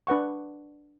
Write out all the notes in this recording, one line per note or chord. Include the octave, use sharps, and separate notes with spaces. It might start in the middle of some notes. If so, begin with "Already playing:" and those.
D4 B4 F#5 C#6